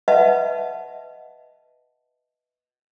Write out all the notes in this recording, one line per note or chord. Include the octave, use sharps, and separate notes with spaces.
B4 D#5 E5 F#5 A5